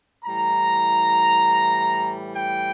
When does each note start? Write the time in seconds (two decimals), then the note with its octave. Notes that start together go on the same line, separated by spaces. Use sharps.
0.25 A2 E3 G3 A#5
2.35 G5